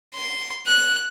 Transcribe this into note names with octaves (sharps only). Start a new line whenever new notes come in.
C6
F#6